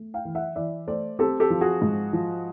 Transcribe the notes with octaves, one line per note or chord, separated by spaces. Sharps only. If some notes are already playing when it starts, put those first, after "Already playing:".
Already playing: A3
F5 G5
E3
E5 F#5
E3 D5 E5
A3 C5 D5
C4 G4 A4
G4 A4
F3
F#4 G#4
G#2
F3